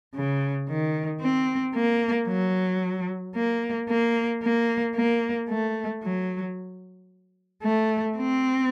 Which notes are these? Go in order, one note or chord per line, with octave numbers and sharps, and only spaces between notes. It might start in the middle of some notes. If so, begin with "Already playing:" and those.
C#3
D#3
C4
A#3
F#3
A#3
A#3
A#3
A#3
A3
F#3
A3
C4